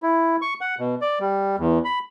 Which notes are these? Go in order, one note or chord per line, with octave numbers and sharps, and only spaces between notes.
E4
C#6
F#5
B2
D5
G3
E2
B5